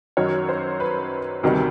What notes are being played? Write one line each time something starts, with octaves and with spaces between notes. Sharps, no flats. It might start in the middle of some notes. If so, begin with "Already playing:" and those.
F#2 D#3 F#3 C#5
C5
B4
D2 C3 D#3 G3 F#4